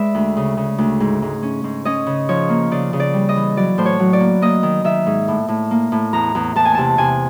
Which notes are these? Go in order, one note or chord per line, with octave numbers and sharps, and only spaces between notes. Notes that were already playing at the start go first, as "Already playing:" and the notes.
Already playing: G#3 B4 D5 E5
D2
C#3
C#3
D2
G#2
G#2
C#4
G#2
C#4 D#5
C#3
F3 C#5
A#3
C#3 D5
C#3
D5
G3
D#5
E3
F#3 D5
A2 C5
C#5
F#3
D5
A#3
A#3 D#5
D#3
D#3 E5
G#2
A2
A2
A#3
A2
E2 A#5
E2
E2 A5
G#5
C3 A5
C3 G#5